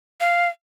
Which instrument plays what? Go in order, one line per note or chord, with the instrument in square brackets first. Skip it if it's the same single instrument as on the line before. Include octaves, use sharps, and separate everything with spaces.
[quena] F5